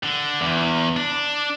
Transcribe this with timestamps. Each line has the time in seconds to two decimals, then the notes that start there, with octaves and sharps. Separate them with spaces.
0.04 D3
0.41 E2
0.96 D4